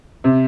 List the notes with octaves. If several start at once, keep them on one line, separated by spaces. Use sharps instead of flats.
C3